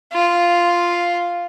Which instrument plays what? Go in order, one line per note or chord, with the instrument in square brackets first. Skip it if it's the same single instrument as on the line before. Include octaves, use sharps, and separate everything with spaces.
[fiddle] F4